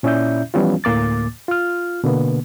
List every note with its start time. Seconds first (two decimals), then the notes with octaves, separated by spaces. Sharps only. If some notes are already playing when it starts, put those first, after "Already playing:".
0.03 A#2 C#4 E4 D5 E5 G6
0.54 E3 F3 G3 B3 C#4 F4
0.84 D2 A2 A#3 D6 A6
1.48 F4 F6
2.04 B2 D3 A#3 B3